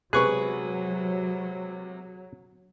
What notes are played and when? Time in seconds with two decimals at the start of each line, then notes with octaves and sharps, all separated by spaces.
0.13 C3 F#3 G#3 B3 G#4 B4 C#6 F#6